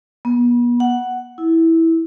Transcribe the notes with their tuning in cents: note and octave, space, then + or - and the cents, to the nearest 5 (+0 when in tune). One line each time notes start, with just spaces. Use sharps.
B3 -40
F#5 +5
E4 -10